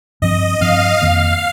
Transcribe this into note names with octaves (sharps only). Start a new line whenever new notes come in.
G2 F3 C4 D#5
G2 F3 C4 F5
F2 D#3 A#3 F5